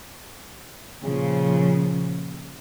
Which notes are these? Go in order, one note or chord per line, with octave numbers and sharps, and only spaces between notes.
A#2 C#3 F3